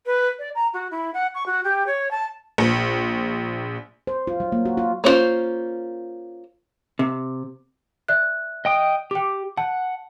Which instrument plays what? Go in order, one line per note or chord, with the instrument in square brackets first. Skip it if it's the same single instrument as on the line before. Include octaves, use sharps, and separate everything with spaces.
[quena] B4
D5
A#5
F#4
E4
F#5
C#6
F#4
G4
C#5
A5
[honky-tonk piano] A#1
[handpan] C5
F4
F#3
A#3
F#4
F4
[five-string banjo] A#3 C#4 D4 F4 C5
[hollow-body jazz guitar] C3
[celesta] D5 E5 F#6
[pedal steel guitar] D#5 G5 D#6
[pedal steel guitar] G4 [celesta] G5 D6
[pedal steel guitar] F#5 [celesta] A5